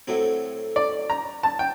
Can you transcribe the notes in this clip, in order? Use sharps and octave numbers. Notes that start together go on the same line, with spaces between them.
A2 F#3 C4
D5
A#5
A5
G5